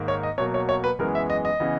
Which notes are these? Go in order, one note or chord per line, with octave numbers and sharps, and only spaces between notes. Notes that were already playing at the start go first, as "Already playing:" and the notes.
Already playing: G#2 D#3 A#3
C#5
D#5
B2 F#3 A#3 C#5
C#5
C#5
B4
F#2 E3 G#3 B3 A#4
E5
D#5
D#5
C#3 E3 B3